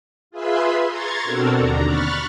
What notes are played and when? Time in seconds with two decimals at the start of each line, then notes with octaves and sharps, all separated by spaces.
0.31 F4 G#4 B4 E5 B5 C6
0.87 A#5 C6 C#6 G#6 A6
1.24 B2 C4 D4 F#4 A4 A#4
1.57 D#2 D3 D4 A#5
1.86 B5 C#6 F6 F#6 A6